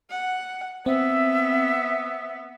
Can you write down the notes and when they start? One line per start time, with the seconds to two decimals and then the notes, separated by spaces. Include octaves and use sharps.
0.10 F#5
0.86 B3 C4 E5